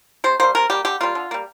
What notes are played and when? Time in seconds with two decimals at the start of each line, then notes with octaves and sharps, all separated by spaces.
0.24 C3 C5
0.40 G3 A#3 C5
0.55 C3 A#4
0.70 G3 A#3 G4
0.85 D3 G4
1.00 G3 A#3 F4
1.15 D3
1.31 G3 A#3